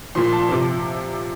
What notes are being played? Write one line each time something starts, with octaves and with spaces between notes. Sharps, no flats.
A#2 F3 C6
A5
C3 F3